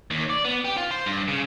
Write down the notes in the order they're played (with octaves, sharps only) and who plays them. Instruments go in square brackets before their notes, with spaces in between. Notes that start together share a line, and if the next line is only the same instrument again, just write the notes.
[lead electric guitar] D#2
D5
B3
G4
F4
C5
G2
C#3